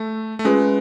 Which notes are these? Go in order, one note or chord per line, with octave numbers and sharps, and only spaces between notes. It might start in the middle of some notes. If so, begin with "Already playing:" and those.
Already playing: A3
A3
G#3 C#4 F4 G#4 B4